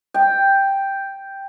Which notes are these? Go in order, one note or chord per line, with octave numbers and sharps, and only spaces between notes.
G5